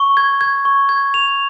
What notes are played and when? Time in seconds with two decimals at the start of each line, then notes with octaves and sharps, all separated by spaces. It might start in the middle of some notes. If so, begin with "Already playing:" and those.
Already playing: C#6
0.17 G#6
0.41 G#6
0.65 C#6
0.89 G#6
1.14 F7